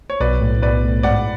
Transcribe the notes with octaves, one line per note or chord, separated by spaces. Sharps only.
C#5
B1 B4 D5
A2
B1 B4 D5
A2
G#2 D5 F#5